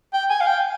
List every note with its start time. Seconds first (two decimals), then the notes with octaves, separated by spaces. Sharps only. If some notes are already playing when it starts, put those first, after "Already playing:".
0.13 G5
0.30 G#5
0.41 F5
0.47 G5